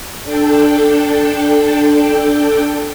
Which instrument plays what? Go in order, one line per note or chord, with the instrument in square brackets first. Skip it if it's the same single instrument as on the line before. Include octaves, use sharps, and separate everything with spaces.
[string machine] D4 A4 G5